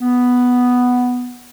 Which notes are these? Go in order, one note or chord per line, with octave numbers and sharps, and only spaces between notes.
B3